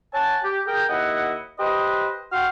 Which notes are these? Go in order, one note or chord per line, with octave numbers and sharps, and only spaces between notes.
C#5 F#5 G#5 A5
G4
G#4 A#4 G5
D#2 E4 D#5 F#5
G4 B4 C5 D#5
F#4 F5 G5 C6 C#6 F6